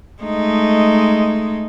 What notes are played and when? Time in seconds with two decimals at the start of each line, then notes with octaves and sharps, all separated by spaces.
0.23 G#3 A3 D#4